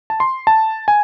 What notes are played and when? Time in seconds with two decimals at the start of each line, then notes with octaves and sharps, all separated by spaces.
0.10 A5
0.20 C6
0.47 A5
0.88 G#5